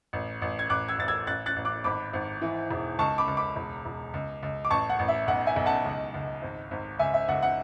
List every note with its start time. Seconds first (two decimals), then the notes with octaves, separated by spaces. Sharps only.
0.13 A1
0.42 A1
0.59 G#6
0.70 A1 D6 F#6
0.88 E6 G#6
0.98 A1 A6
1.08 E6 G#6
1.27 A1 F#6 A6
1.46 F#6 A6
1.56 A1
1.65 D6 F#6
1.84 G#1 B5 D6
2.13 G#1
2.42 E3
2.71 E1
2.99 C#2 A5 C#6
3.18 B5 D6
3.28 C#2
3.37 B5 D6
3.56 E1
3.85 E1
4.14 C#2
4.43 C#2
4.65 D6
4.70 A1 A5 C#6
4.90 F#5
4.99 A1
5.08 E5
5.28 B1 F#5
5.46 E5 G#5
5.56 B1
5.66 F#5 A5
5.85 C#2
6.14 C#2
6.42 G#1
6.71 G#1
6.99 C#2 E5 G#5
7.14 E5
7.28 C#2 F#5
7.43 F#5